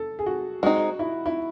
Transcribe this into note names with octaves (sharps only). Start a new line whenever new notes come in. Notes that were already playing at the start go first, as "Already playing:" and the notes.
Already playing: A4
G#4
F#4
G#3 C4 D#4 F#4
E4
E4